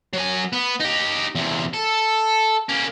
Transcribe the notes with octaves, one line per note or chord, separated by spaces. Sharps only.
F#3 G#5
B3
D#4 G4
E2 C3
A4
A#3 C#4